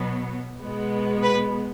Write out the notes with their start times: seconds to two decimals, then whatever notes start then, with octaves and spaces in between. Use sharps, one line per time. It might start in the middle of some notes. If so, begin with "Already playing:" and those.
Already playing: B2 F#3 B3
0.62 B2 G#3 B3
1.23 B4